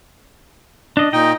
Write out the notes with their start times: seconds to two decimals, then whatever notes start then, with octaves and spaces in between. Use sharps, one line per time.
0.97 D4 D#5
1.13 A#2 D#4 D#5 G5